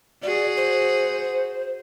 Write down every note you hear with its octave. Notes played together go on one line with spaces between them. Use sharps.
F#4 G#4 D5
C5